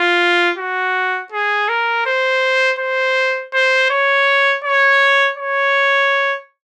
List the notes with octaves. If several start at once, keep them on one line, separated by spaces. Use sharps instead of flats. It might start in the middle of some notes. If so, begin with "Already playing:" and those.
Already playing: F4
F#4
G#4
A#4
C5
C5
C5
C#5
C#5
C#5